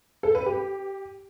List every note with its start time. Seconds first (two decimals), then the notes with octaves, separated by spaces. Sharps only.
0.23 A4
0.35 B4
0.46 G4